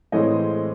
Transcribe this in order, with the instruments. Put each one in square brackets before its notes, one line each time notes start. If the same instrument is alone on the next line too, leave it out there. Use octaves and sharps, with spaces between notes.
[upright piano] A2 E3 G#3 C4 C#5 D#5